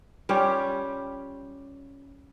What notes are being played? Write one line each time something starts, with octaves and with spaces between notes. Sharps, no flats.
G3 C#4 F4 G4